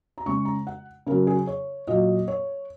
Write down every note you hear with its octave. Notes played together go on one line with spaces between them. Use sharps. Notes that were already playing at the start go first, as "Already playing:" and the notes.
A#5
C#3 G#3 C#6
A#5
F#5
C#3 F#3 A#4
G#4
C#5
A#2 F#3 D#5
C#5